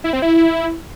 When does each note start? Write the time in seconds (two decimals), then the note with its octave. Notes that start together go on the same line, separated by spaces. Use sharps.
0.04 E4
0.13 C4
0.22 E4